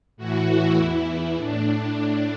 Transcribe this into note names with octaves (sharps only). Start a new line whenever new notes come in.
A2 E3 F#4
E4
E2 E3
E4
A2 D4